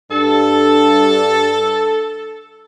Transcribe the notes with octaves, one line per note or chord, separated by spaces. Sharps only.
G2 D4 A4